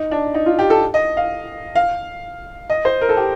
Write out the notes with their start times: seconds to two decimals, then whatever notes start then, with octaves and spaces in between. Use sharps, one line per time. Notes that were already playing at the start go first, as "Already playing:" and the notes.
Already playing: D#4
0.11 D4
0.34 D#4
0.46 F4
0.59 G4
0.70 A4
0.94 D#5
1.17 F5
1.75 F5
2.70 D#5
2.85 C5
3.01 A#4
3.09 A4
3.17 G4